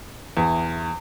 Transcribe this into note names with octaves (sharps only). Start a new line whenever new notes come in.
E2